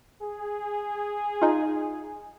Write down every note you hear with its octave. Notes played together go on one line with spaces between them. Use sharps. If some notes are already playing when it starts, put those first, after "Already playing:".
G#4
D#4 F4